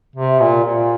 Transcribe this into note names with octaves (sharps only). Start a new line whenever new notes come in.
C3
A#2
A#2